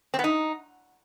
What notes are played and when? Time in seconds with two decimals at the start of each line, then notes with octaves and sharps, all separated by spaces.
0.14 C4
0.19 B3
0.24 D#4